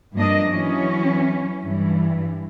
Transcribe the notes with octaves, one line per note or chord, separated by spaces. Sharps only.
G2 F3 A#3 D4 D#5
E3 F#3 C#4
G2 E3